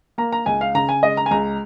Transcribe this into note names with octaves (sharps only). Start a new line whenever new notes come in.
A#3 A#5
A#5
C#2 G#5
F5
C#3 A#5
G#5
G#3 D#5
A#5
G#5
C#2 A#5